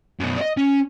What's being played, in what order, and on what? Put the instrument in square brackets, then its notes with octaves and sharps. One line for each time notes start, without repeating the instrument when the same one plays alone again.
[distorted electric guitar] F#2 B2
D5 D#5
C#4